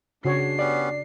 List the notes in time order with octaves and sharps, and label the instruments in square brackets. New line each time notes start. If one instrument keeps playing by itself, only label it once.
[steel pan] C#3 F#4 C#5 [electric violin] D4 C7
[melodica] B3 C#4 G4 [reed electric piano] D5